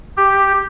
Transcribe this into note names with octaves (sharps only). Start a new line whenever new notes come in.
G4